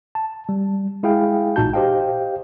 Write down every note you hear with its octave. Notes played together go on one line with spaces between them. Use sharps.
A5
G3
G#3 E4 G#4 F5 G5
A1 A#2 D#4 F#4 A5 G6
G4 C5 D#5 F5 G5